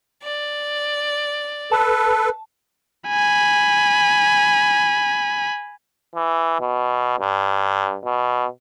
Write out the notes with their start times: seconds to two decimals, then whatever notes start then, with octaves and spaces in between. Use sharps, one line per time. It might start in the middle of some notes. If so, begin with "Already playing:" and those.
0.23 D5
1.72 A4 B4 A5
3.08 G#5 B5
6.15 E3
6.61 B2
7.20 G2
8.05 B2